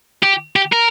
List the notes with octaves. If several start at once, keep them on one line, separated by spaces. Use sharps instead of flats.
G4
G4
A#4